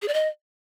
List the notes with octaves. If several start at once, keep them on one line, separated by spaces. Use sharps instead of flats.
G#4
D5
D#5